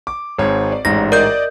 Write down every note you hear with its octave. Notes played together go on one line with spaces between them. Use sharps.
D6
G#1 G#2 C#5
D5
A1 G#2 A#6
A#4 D5 D#5 G6